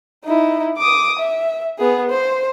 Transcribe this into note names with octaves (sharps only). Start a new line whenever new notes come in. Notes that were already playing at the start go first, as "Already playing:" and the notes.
D#4 E4
D6 D#6
E5
B3 G#4
C5